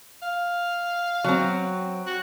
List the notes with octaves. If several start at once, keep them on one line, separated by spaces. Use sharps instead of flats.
F5
F#3 C4
F#4